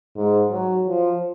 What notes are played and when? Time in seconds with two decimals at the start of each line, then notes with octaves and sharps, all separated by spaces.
0.16 G#2
0.52 F#3
0.88 F3